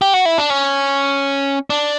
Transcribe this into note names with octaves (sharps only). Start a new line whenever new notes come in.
G4
F#4
E4
D4
C#4
D4